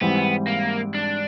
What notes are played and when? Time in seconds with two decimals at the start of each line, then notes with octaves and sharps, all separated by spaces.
0.01 G#2 E3 G3 B3 C4
0.48 A#3
0.94 D4